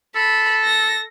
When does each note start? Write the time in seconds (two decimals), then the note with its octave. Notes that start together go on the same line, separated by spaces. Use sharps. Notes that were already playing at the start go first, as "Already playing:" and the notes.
0.15 A4 B5
0.65 A#6